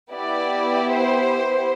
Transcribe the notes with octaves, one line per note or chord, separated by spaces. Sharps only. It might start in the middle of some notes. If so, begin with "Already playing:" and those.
B3 E4 G4 D5
C5